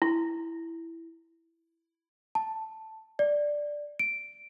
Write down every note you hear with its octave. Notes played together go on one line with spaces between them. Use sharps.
E4
A5
D5
D7